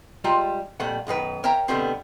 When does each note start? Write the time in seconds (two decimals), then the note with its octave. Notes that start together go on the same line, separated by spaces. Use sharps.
0.24 G3 G#3 F4 G5 A#5
0.80 F2 A#2 G3 A3 F#5
1.07 B1 F#2 D#3 B4
1.44 A#4 C#5 E5 G5 A#5
1.68 B2 D3 G3 A3 B3 C4